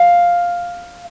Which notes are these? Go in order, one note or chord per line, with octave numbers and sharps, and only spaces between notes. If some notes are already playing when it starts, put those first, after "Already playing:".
Already playing: F5